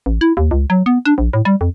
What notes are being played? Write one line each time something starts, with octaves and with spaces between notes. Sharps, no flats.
A1
E4
D#2
C#2
F#3
B3
D4
A#1
A2
G3
F2